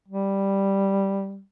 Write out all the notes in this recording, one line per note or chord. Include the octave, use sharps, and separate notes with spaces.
G3